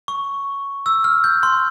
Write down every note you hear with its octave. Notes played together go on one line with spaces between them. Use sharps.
C#6
E6
F6
G6
C6